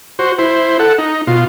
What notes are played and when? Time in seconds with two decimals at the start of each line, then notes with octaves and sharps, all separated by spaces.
0.19 F#4 C5
0.39 E4 C5
0.79 A4 F#5
0.98 D#4
1.27 B2 F4